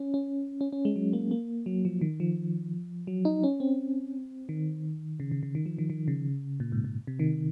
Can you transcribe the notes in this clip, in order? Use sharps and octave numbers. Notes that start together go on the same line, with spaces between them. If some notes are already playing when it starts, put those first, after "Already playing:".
Already playing: C#4
C#4
C#4
C#4
G#3
F#3
A#3
A#3
F#3
F3
D#3
F3
F#3
D#4
C#4
C4
D#3
C#3
C#3
C#3
D#3
F3
D#3
D#3
C#3
A#2
G#2
A#2
C3
D#3